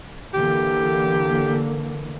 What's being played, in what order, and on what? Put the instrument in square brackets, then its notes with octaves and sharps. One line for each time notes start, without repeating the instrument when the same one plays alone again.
[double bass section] D3 E3 A#3 [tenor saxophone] G4